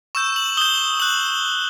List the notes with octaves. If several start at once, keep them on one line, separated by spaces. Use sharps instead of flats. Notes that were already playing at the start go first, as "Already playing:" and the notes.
C#6 E6 G6 E7
F#7
D#6 G6 G7
D#6 F#6 F#7